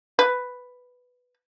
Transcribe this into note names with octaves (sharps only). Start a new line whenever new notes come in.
B4